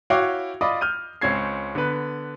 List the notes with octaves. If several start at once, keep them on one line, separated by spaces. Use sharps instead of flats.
E4 F#4 C#5 F5 G5 D6
F4 D5 D#5 B5 D6 D#6
F6 G6 D#7
C#2 C4 C#4 G#6 C7
D3 B3 B4